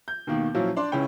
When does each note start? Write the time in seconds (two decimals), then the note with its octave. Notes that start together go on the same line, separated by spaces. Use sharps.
0.08 G6
0.27 D#2 B2 D#3 A#3
0.54 A#2 F3 F#3 C#4 E4 F4
0.77 D4 D5 C6
0.92 C#2 C#3 C#4 E4 G5 B5